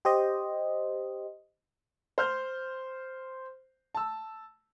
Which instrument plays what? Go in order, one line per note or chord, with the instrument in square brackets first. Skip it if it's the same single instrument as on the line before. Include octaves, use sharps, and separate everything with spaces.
[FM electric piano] G4 C5 D#5
[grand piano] C5 F6 G6
A5 E6